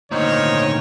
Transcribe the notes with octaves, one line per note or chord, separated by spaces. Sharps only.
D2 A#2 D#3 D#4 C5 C#5